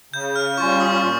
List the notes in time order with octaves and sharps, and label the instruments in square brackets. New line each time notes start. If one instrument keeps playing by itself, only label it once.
[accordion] C#3 [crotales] G6
[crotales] F6
[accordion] G3 C#4 F4 [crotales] C#6
[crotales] D#6
[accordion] A#2